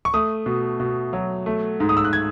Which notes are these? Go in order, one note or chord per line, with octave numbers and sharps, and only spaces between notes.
C#6
A3 D#6
B2
B2
F#3
A3
G#2
D#6
E6
F#6
G#6